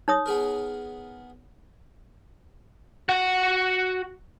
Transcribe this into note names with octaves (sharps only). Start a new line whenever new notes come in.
D#4 C#5 D#6
B3 G#4 A#4
F#4 F#5